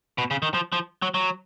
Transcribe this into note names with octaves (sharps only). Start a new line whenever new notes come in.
B2
C#3
D#3
F3
F3
F#3
F#3